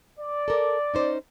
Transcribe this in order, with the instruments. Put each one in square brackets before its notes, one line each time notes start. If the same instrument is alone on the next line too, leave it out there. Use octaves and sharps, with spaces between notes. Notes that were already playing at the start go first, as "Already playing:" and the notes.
[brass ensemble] D5
[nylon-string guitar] A4 A#4
C#4 D#4 C5